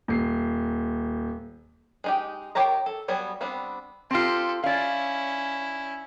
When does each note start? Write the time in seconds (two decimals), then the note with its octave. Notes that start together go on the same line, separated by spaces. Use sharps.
0.08 D#1 C7
2.04 G#3 D#4 G4
2.55 D#3 G4 C#5 A5 A#5
2.86 A4
3.08 F#3 G3 B3 F#4 G#5
3.41 G3 B3 C4 D4
4.11 C4 F4 G4 A4
4.64 C#4 E4 D5 F5